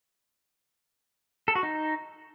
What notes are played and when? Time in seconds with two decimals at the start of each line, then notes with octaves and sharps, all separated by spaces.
1.48 A4
1.55 F#4
1.63 D#4